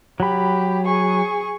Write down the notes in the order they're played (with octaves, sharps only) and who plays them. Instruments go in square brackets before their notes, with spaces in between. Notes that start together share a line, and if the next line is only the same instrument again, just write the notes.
[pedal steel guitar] F#3 B5 [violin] G4
[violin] G#4 C#6